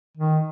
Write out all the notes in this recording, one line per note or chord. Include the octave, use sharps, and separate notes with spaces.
D#3